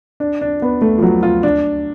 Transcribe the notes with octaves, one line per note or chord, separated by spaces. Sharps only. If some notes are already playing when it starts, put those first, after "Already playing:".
D4
D4
B3
A3
F3
F#3
F4
D4